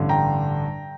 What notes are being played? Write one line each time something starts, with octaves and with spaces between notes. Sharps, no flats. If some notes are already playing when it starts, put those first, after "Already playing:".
Already playing: A1 G2 D3
G5 A#5